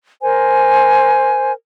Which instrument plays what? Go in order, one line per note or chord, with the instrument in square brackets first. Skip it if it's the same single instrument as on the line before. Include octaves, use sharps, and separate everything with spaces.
[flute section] A#4 C5 G#5